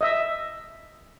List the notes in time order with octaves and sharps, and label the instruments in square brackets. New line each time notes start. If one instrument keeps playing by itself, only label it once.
[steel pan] D#5 E5